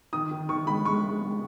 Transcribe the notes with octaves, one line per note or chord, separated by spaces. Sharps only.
D#3 D#6
D#3
D#3 C#6
G#3 B5
G#3 C#6
G#3
G#3